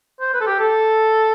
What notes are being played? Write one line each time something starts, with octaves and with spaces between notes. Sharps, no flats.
C5
B4
A4
G4
A4